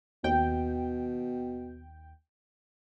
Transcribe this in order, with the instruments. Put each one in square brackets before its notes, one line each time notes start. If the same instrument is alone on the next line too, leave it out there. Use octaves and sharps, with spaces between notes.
[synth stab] D#2 G5 [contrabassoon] B2